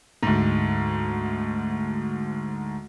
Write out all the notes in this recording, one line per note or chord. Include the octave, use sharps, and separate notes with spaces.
D2 G#2